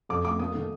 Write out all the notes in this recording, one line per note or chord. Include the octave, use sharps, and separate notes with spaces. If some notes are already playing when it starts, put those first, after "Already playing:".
F2 D6
A3 D6
A#3 D#6
D#3